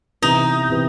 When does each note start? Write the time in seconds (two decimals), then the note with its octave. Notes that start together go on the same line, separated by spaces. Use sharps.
0.22 C3 E3 B3 D#4
0.70 C3 E3 B3